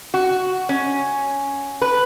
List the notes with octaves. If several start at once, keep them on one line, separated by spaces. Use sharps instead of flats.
F#4
C#4
B4